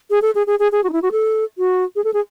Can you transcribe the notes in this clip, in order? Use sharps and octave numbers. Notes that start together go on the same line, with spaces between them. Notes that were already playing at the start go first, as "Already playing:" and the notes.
G#4
A4
G#4
G#4
G#4
G#4
F#4
D#4
E4
F#4
A4
F#4
G#4
A4
G#4